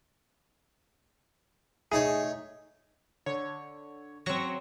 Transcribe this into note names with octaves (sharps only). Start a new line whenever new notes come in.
A3 D#4 G#4 C#5
D3 C#5
F#3 C4 C#6 A#6